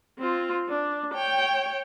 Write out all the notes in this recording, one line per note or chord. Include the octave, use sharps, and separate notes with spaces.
C4 F4
D4
C#5 G5